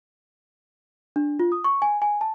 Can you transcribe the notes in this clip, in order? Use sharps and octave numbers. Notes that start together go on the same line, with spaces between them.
D4
F4
D#6
C#6
G#5
G#5
A5